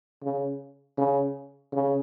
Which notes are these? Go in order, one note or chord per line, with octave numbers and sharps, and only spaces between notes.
C#3
C#3
C#3